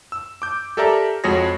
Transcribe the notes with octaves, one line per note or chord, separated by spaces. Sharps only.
E6
D6 G6
G4 A4 A#4 D5 E5 A#5
F2 G#3 F#4 G#4 C#5 A#6